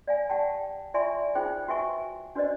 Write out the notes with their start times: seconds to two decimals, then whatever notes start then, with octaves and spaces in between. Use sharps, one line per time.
0.07 D5 F5 G#5
0.29 G4 F#5 G5 A5
0.94 F4 D5 E5 G#5 C6 C#6
1.35 D#4 F4 G#4 C5 G5
1.68 F#4 B4 E5 G#5 C#6
2.35 D4 F#4 B4 C5 D5 D#5